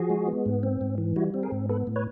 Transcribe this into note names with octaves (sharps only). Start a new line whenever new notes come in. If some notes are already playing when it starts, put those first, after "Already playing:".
Already playing: F3 F#4 G#4
G#3
B3
G#2
C4
G#2
E3
G3 E4 F#4
C4
G#4 A#4
G#2
B3 A4 B4
A2
B4 C#5